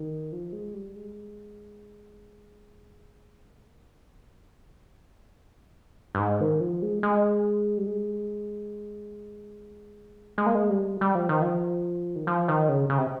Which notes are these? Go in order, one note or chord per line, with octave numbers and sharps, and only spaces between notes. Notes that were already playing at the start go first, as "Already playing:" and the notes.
Already playing: D#3
F3
G#3
G3
G#3
A#3
G#3
A#3
F3
G3
G#3
G3
D#3
C#3
C3
G2
G#2
D#3
F3
G#3
G#3
G3
G#3
G#3
A#3
G#3
G3
G3
F3
D#3
F3
D#3
F3
D#3
C#3
C#3
C3